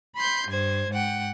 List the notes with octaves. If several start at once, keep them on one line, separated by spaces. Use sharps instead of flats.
B5 C6 G6
G2 C5 G#6
G#2 F#5 G5